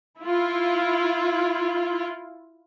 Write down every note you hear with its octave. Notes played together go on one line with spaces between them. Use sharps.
E4 F4